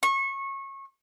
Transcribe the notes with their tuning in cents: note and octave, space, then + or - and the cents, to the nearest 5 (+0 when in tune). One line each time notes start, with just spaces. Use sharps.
C#6 -25